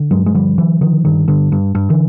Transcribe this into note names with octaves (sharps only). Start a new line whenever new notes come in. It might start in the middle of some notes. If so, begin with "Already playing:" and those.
Already playing: D3
G2 F#3 G#3
G#3
D3 F3 G3
D3 E3 F#3
D3 D#3 F3
G2 D#3
G2 D3
G2
G2
D3 E3